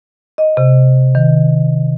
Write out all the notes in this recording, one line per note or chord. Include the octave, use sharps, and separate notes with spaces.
D#5
C3
D#3